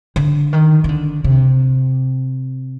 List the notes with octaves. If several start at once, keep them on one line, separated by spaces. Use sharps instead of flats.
D3
D#3
D#3
D3
C3